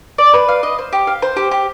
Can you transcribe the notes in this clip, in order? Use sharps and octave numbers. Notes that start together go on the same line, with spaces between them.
D5
B4
F5
D#5
C5
G4
F5
C5
G4
G4